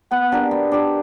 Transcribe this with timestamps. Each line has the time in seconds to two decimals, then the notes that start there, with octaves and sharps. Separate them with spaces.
0.11 B3 F#5
0.32 D4 G4 A#4
0.51 B3
0.72 D4 G4 A#4